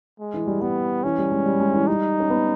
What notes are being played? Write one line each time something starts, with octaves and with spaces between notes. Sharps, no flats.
G#3
E3
G3
G3 B3
E3 C#4
G3
G#3
G3
G#3
E3
G3 D#4
C#4
B3